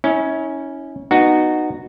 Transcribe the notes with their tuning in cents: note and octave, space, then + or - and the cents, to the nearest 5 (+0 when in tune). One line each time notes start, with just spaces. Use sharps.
C#4 +0 E4 -40
B3 +0 D#4 -20 F#4 +0